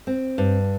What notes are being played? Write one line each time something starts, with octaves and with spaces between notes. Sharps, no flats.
C4
G2